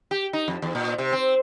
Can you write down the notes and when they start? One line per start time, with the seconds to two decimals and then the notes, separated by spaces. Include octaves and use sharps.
0.11 G4
0.33 D#4
0.48 F2
0.62 E2
0.75 A#2
0.98 C3
1.13 C4